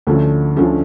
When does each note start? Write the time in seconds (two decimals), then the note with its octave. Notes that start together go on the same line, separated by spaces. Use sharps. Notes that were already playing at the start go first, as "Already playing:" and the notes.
0.07 D2 D3 F3 A3 C#4
0.57 D2 D3 F3 A3 C#4